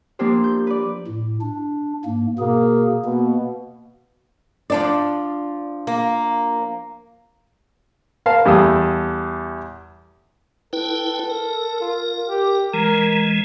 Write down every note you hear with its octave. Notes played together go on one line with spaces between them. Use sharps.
F3 A#3 C4 D4 G4 C5
G6
B4 D5
A2
D4
G#2 A#3
B2 A#3 G#4
B2 A#3
F3 D4 D5
A#3
A#4 F5 A5
E2 G3 A4 D#6
E4 A4 B4 G5
A#4
F4
G4
E3 G#3 A#4